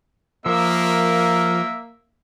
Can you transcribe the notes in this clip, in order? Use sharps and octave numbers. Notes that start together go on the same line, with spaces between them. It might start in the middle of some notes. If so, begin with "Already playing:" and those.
F3 A#3 A#4 E5 E6